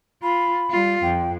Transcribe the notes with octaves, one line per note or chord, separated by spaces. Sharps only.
F4 B5
G3 F4
F2 G5